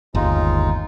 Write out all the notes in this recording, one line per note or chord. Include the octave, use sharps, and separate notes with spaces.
G1 D#2 G#3 D#4 F4